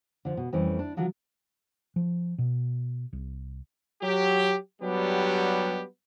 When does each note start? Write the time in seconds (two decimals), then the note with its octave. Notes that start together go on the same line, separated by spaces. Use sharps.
0.25 D3 F3
0.37 B2
0.53 F2 E3 G3 A3 C#4
0.79 D4
0.97 D3 F3 F#3 D4
1.96 F3
2.38 B2
3.13 C2
4.03 F#3 G4
4.82 F#3 G3 B3 D4 G4